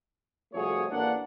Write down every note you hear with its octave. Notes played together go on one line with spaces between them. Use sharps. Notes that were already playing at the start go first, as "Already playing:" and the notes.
C2 F2 A3 F#4 G#4 C#5
A1 A#3 D4 F#5